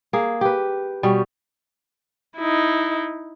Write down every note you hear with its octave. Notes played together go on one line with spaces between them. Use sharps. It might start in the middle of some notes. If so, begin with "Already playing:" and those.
A#3 G#4
G4 B4
B2 G3 C#4
D#4 E4